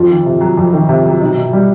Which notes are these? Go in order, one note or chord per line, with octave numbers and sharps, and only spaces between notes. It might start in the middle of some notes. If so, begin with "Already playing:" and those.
Already playing: F2 F4
D#3
C3
F#3
F2
D#3
C3
F#3
B2 D#4
B2
G3